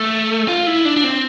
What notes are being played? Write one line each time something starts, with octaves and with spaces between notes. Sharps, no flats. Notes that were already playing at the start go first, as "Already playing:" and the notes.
Already playing: A3
F4
E4
D4
D4
C4